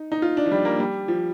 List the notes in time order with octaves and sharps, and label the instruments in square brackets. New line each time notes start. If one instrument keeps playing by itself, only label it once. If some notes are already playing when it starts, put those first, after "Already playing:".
Already playing: [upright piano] D#4
D#4
F4
D4
F3
G3
A#3
G3
F3